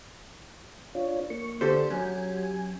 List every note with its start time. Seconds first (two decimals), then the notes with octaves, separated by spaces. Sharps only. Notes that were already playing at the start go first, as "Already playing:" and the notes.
0.95 D4 F4 C#5
1.30 A#3 C#6
1.61 D3 G4 A4 C5
1.90 F#2 F#3 G#5